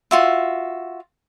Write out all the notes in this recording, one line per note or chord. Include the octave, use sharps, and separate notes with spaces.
F4 F#4 E5